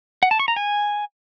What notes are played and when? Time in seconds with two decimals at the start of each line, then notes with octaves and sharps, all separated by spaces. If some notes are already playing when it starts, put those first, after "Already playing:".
0.23 F#5
0.31 A5
0.39 C#6
0.48 A#5
0.56 G#5